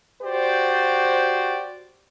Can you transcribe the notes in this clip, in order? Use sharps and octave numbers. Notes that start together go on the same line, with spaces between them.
F#4 G4 C5 D5